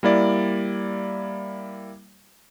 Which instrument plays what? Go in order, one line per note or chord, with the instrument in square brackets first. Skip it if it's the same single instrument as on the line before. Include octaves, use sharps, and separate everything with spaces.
[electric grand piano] G3 A#3 E4 D5